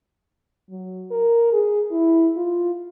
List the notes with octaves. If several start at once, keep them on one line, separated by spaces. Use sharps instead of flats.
F#3
A#4
G#4
E4
F4